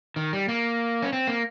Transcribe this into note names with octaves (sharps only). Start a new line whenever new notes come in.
D#3
G3
A#3
C#4
C4
A#3